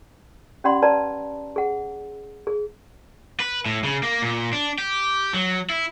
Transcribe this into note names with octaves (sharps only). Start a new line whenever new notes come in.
C#4 G4 D5 F#5 B5 C6
B4 D5 A5 A#5
G#4 F#5
G#4
B4
A2
C#3
A#3
A#2
D4
G4
F#3
E4